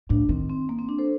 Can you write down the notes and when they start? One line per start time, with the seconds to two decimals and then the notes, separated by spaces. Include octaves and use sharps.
0.09 A2 D4
0.29 D#3 C4
0.49 C4
0.69 A#3
0.79 C4
0.89 D4
0.98 A4 C5